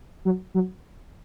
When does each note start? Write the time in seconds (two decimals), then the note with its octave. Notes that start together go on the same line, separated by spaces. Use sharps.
0.25 F#3
0.54 F#3